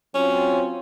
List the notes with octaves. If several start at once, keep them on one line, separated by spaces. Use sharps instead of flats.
F#3 C4 C#4 F4